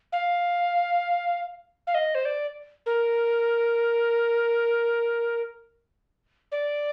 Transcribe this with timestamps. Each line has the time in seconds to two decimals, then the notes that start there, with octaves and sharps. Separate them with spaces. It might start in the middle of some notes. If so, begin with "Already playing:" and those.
0.12 F5
1.87 F5
1.95 D#5
2.15 C5
2.25 D5
2.86 A#4
6.52 D5